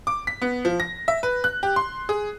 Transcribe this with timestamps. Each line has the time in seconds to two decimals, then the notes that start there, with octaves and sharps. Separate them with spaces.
0.07 D6
0.27 B6
0.42 B3
0.65 F3
0.80 A#6
1.08 E5
1.23 B4
1.44 F#6
1.63 G4
1.76 C6
2.09 G#4